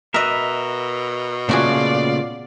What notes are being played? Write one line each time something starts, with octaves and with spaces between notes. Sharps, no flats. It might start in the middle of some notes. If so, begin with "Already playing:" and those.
B2 A#4 B4 D#5 E5
A#2 C#3 A3 B3 F4 F#4 G#4 D5